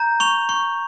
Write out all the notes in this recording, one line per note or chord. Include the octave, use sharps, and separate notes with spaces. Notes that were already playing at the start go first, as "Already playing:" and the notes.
Already playing: A#5 G6
C#6 F7
C#6